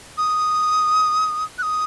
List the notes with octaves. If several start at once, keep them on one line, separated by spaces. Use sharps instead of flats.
D#6
F#6
D#6